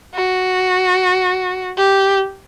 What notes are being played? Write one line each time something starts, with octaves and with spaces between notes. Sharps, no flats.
F#4
G4